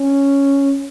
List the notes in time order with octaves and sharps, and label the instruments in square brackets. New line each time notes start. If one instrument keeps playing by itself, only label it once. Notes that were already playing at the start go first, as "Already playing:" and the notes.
Already playing: [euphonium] C#4